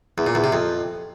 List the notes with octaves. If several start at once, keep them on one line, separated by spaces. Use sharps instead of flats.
E2
A#2
E2
C3
F2